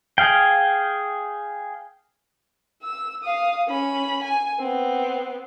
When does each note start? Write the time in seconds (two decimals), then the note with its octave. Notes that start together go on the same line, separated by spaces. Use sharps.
0.18 G#4 F5 G5
2.83 E6
3.23 F5 D#6
3.68 C#4 B5
4.24 G#5
4.60 B3 C4